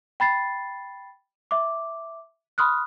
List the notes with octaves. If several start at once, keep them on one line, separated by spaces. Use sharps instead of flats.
G5 B5 A6 C7
E5 D6
B5 C6 D#6 F6 F#6